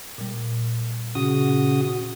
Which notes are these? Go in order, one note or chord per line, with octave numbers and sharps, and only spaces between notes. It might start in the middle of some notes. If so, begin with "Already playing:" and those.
A#2 G3
A#2 C#3 F#4 F#5 D#6